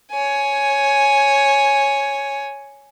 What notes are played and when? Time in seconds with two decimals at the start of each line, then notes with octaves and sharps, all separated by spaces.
0.11 C#5 G#5